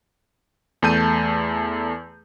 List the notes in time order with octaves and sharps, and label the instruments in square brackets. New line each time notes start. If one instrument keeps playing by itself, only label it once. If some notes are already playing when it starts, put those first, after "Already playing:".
[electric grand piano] E2 A3 A5 G6 D#7